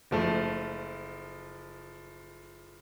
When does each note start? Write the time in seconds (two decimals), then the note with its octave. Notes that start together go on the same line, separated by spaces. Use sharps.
0.11 F#1 F3 A3